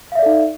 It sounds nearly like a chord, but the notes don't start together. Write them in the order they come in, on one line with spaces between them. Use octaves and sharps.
F5 E5 D5 A4 D#4